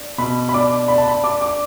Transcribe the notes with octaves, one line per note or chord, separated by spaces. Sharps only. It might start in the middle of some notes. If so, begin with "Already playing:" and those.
Already playing: D4
B2 B5
B5
D4 D6
D4 B5
A5
B5
D4 D6
D6